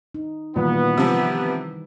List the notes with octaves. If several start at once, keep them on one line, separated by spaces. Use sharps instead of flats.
D#4
A#2 D#3 E3 G3 B3
C3 F3 E6